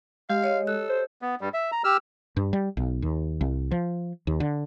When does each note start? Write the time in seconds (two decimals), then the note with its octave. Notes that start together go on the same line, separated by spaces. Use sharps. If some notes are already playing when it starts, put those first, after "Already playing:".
0.30 G#3 G4 F5
0.43 C#5 D#5
0.67 A4 F#6
0.89 C5
1.22 B3
1.41 G2 G3
1.54 E5
1.72 A#5
1.84 G4 E6 F6
2.37 G2
2.53 G3
2.77 B1
3.02 D#2
3.41 C2
3.71 F3
4.27 D#2
4.40 D3